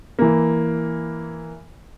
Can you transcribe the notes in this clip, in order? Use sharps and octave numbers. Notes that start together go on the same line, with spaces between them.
E3 A#3